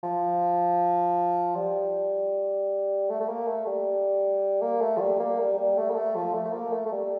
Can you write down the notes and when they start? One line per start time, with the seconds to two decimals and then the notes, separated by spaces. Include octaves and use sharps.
0.03 F3
1.56 G3
3.09 A3
3.20 A3
3.29 A#3
3.47 A3
3.67 G3
4.62 A#3
4.81 A3
4.97 F3
5.00 G3
5.19 A#3
5.39 G3
5.58 G3
5.77 A3
5.90 A#3
5.96 A3
6.16 F3
6.34 A3
6.45 A3
6.53 A#3
6.73 A3
6.86 A3
6.92 G3